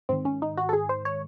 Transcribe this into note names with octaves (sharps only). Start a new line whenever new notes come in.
G#2 D#3 C4
C#4
D#4
F#4
A4
G#4
C5
C#5